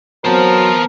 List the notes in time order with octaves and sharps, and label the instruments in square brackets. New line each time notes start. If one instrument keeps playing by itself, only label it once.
[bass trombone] F#3 [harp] B3 C4 [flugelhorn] A#4 [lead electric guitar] C5 A5